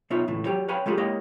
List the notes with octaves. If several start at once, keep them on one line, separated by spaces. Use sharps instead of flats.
B1 B3 D#4 F4 C#5 E5
C#2 A2 E3
F#3 F#4 G4 C#5
B4 C#5 F5 G5 G#5 B5
G#3 A3 F4 G4 G#4
G#3 A#3 E4 G4 C#5 D#5